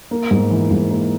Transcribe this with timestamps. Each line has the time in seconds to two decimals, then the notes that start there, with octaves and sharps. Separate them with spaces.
0.11 A#3
0.31 G#2
0.51 E3
0.71 G#2
0.90 A#3